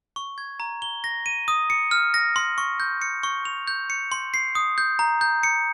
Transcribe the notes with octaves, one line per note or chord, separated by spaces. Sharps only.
C#6
G#6
A#5
G7
A#6
D#7
D#6
C#7
F6
A#6
C6
C#6
G6
C#7
C#6
F7
G6
C#7
C6
C7
D#6
G6
A#5
G6
C#7